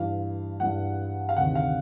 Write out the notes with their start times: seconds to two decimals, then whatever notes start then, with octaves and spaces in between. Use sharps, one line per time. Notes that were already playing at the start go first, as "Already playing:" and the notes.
Already playing: G2 E3 F5
0.60 G2 E3 F#5
1.29 F5
1.36 D2 C3 D#3 F#5
1.55 F5